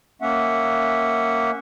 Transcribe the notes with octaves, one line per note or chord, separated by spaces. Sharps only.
A#3 C#4 E5 F#5